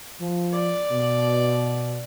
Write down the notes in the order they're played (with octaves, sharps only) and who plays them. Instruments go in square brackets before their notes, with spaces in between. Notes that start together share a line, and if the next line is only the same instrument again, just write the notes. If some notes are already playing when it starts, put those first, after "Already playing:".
[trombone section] F3
[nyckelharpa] D5
[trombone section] B2